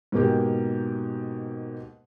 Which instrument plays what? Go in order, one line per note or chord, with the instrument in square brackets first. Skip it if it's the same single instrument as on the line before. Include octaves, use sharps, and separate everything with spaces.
[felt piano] G#2 B2 A#3 G4